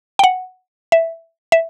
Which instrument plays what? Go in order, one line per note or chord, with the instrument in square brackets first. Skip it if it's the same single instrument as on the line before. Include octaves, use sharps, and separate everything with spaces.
[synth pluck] G5
F#5
E5
E5